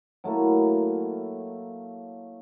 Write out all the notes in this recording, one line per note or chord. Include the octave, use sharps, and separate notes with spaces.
F#3 A3 A#3 E4